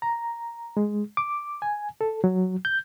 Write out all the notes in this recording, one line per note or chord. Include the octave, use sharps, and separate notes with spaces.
A#5
G#3
D6
G#5
A4
F#3
G6